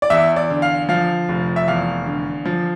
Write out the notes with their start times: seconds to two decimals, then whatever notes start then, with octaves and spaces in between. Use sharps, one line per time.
0.02 D5
0.10 E2 E5
0.36 D5
0.50 D3
0.62 F5
0.89 F3 F5
1.29 F1
1.56 E5
1.68 E2 F5
2.06 D3
2.45 F3